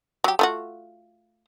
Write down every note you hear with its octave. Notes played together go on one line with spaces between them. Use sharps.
F#3 G4
A3 F4 F#4